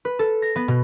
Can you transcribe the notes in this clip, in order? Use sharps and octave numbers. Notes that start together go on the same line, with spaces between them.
B4
A4
A#6
B3
B2